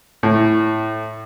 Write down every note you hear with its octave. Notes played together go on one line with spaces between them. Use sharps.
A2